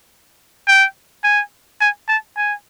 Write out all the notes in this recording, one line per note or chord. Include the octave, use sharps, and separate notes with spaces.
G5
G#5
G#5
A5
G#5